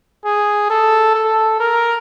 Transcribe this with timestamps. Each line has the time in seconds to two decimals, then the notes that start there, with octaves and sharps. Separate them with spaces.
0.25 G#4
0.70 A4
1.15 A4
1.60 A#4